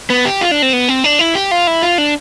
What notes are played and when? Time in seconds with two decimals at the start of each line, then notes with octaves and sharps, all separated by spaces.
0.10 B3
0.25 G4
0.41 F4
0.51 D4
0.62 C4
0.73 B3
0.89 C4
1.04 D4
1.19 E4
1.35 G4
1.51 F4
1.67 E4
1.83 F4
1.98 D4